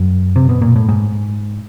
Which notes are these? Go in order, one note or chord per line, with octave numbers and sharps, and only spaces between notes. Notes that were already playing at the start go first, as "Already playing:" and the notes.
Already playing: F#2
C3
B2
A#2
A2
G#2